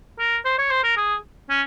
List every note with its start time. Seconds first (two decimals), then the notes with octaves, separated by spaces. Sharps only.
0.19 A#4
0.45 C5
0.59 C#5
0.71 C5
0.84 A#4
0.97 G#4
1.50 C#4